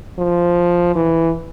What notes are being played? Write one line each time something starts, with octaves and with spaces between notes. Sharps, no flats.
F3
E3